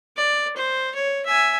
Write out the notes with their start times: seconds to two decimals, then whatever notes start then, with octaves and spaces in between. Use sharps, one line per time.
0.17 D5
0.57 C5
0.95 C#5
1.26 E5 G#5